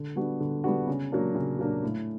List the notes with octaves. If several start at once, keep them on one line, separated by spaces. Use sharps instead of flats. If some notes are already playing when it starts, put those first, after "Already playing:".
Already playing: D3
G3 B3 D4 F#4
D3
G3 B3 D4 F#4
C#3
F#3 A#3 D4
C#3
F#3 A#3 D4
A2